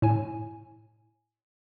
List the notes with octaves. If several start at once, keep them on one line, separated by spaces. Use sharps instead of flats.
A2 G#5